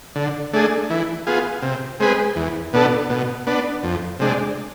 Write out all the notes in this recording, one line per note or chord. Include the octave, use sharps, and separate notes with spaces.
D3
A3 D4 G#4
E3
B3 F4 G#4
C3
G#3 C4 G#4 B4
E2
B2 B3 D4 A4
B2
B3 D4
F2
C3 G#3 D4